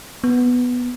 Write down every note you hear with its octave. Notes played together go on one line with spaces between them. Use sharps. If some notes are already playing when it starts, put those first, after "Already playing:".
B3